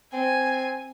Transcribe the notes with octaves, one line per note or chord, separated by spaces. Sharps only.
C4 G#5